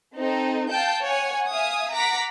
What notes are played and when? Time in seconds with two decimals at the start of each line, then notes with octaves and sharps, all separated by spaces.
0.16 C4 D#4 A4
0.69 F5 G5 A5 G6
1.05 C#5 F#5 G#5
1.50 E5 F5 G#5 D#6
1.94 F#5 A#5 D6 B6